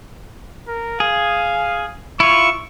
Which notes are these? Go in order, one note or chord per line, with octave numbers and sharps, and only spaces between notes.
A#4
G#4 F5
E4 F4 C#6